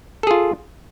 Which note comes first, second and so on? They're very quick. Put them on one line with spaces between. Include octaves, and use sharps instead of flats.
A4 G#4 F4